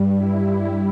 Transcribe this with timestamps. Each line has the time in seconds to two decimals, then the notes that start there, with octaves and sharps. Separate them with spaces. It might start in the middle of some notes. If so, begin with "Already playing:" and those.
Already playing: G2 G3
0.16 E4